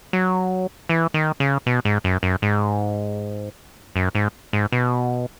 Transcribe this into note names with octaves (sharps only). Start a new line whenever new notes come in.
F#3
E3
D#3
C#3
B2
G#2
F#2
F#2
G#2
F#2
G#2
G#2
B2